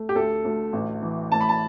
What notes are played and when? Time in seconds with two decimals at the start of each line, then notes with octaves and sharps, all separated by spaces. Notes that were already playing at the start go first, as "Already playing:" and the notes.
Already playing: A3
0.09 G4
0.15 D2 A4
0.45 D2
0.73 A1
1.02 E3
1.32 A2 A5
1.41 B5
1.49 A5